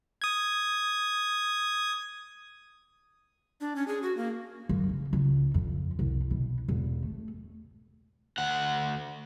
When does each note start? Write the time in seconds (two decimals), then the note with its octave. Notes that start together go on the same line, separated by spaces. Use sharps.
0.22 D#6 G#6
3.61 D4
3.76 C#4
3.88 G#4
4.03 F#4
4.17 A#3
4.69 F#2
4.89 C#3
5.13 C#2
5.54 F2
5.99 C2
6.31 B2
6.69 E1
7.03 A3
8.38 D2 F#5